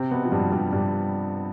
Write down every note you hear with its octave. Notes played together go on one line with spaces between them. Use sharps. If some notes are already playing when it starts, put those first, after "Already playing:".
Already playing: C3 C4
B2 B3
F3
G2 G3
G2 G3
G2 G3